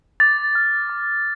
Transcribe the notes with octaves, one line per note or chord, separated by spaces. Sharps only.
D6 A6
F6
D6